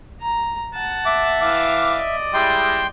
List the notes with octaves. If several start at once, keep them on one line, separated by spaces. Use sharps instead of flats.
A#5
F#5 A5
E5 D6
E3 F5 D6
D5 D#5
G3 G#3 E4 G5 C6